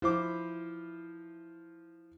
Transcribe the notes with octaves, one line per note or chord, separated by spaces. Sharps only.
F3 E4 C5 D6